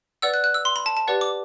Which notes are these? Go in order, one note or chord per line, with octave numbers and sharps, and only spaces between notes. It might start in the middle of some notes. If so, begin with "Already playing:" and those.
B4 D5 F#5 E6
F#6
F#6
E6
C6
B5
A5
A5
G4 B4 D5 F#5
D6